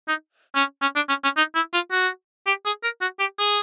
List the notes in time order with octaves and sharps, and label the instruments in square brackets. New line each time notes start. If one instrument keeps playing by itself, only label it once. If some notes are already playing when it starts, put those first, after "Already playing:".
[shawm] D#4
C#4
C#4
D4
C#4
C#4
D#4
E4
F4
F#4
G4
G#4
A#4
F#4
G4
G#4